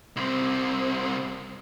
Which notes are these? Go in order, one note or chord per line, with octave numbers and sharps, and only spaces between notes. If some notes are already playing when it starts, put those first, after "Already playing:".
C2 C4